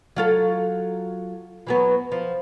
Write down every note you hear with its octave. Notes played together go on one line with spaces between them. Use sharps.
F#3 F4 A4
E3 F#3 B3
F3